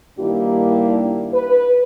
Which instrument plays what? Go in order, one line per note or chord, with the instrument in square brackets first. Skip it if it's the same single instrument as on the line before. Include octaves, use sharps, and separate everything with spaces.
[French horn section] G2 D#3 A#3 D4 E4 G4
B4